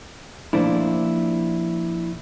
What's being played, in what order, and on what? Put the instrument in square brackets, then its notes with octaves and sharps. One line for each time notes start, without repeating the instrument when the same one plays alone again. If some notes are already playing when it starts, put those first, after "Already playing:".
[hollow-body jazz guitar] A#2 F3 D4 E4